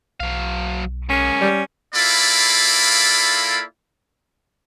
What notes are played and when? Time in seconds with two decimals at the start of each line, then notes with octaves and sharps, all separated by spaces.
0.20 B1 F#3 F5
1.10 G#3 A#3 C#4
1.41 G3
1.94 A#3 E4 F4 A4 D5 B5